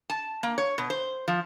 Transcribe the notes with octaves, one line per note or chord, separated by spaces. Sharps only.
A5
A#3
C#5
B2
C5
F3